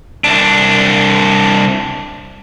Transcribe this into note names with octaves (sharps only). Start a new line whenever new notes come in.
C2 D4